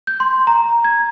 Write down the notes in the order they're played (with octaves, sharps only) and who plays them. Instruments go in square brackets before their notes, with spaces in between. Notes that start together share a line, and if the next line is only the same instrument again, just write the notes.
[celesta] G6
C6
A#5
G#6